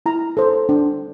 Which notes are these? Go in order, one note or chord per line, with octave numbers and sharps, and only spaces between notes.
E4 A#5
A4 C5
D4